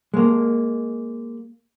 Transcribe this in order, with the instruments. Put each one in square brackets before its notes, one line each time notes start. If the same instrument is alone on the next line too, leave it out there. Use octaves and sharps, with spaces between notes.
[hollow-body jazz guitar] G#3 A#3